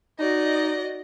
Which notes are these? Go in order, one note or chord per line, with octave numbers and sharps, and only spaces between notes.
D#4 F#4 D5 D#5